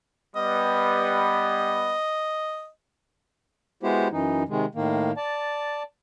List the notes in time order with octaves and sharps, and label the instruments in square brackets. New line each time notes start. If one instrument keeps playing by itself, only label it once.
[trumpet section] G3 B3 [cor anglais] D#5
[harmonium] G#3 B3 E4 F#4 G4 C5
F#2 E3 D#4
C3 D#3 G#3
A2 D#3 A#3
D5 A5